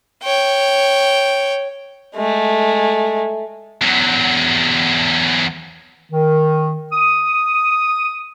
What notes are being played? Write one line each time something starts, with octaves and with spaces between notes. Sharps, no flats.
C#5 G5
G#3 A3
E2 F#3
D#3
D#6